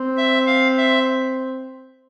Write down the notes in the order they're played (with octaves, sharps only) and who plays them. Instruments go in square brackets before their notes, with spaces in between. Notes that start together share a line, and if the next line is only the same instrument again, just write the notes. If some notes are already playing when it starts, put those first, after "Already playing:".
Already playing: [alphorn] C4
[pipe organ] E5
F5
E5